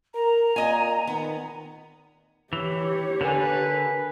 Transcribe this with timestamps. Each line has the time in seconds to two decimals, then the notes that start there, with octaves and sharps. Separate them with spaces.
0.15 A#4 A#5
0.56 A#2 D#5 G#5
1.07 D#3 B3
2.53 E3 G4 C#5
3.21 D3 A#4 B4 G#5